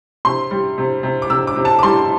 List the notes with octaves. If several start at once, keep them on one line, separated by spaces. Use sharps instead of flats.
C3 C6
G3
C3
C3
D6
C3 E6
D6
C3
A5
D6
G3 C6